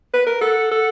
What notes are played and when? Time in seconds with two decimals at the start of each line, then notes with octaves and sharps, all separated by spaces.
0.14 B4
0.27 A#4
0.41 A4 F#5
0.71 A4